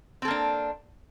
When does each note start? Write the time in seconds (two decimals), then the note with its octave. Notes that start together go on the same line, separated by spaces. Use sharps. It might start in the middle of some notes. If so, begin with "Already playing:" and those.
0.22 C4
0.25 A4
0.28 A#3
0.31 D4